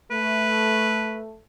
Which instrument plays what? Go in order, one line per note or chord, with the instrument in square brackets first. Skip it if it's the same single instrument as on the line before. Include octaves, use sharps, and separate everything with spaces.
[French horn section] A3 [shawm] B4